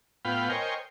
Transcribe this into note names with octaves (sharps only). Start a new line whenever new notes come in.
A2 B3 F4 F5 G5 B5
A#4 C5 C#5 D#5 G5 G#5